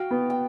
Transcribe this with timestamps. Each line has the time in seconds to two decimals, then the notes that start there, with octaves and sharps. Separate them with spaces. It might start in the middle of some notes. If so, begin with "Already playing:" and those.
Already playing: F#4 F5 G5
0.11 B3
0.30 G5